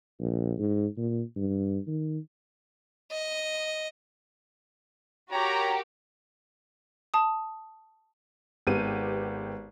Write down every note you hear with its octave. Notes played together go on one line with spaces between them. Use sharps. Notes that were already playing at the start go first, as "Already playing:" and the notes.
A#1
G#2
A#2
G2
D#3
D#5
F#4 G4 A#4 C#5 A#5
A5 D#6
G#1 B3 G4 D#7